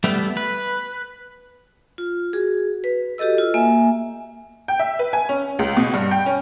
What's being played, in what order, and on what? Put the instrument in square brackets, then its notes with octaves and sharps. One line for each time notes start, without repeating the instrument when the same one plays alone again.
[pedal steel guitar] G3 A3 B3 G4
B4
[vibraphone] F4
F#4 G#4
B4
F#4 G4 A4 D#5 E6
F4
A#3 E5 G#5
[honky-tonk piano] G5
E5
B4
G#5
C#4
C#2
B2
G2
G5
C#4